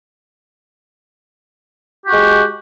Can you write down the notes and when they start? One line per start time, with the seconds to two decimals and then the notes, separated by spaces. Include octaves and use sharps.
2.05 G4
2.08 F#4
2.12 G#3